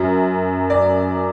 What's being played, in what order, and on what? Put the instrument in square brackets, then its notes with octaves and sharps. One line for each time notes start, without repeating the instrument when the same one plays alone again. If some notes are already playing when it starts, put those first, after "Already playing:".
Already playing: [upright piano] F#2 F#3
D5